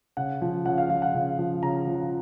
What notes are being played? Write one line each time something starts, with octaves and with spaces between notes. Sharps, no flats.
C#3 F#5
F3
C#3 F#5
F5
F3 F5
F#5
C#3
F3
C#3 A#5
F3